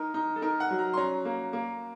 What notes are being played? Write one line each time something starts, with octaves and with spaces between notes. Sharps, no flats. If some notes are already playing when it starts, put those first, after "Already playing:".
Already playing: D#4 A#4
D#4
A4
D#4 A#4
F#5
F#3
A#5
C6
C#4 A#5
A#3
A#3